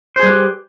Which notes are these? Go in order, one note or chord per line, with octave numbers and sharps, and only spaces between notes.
G3 G4 G#4 B4 C5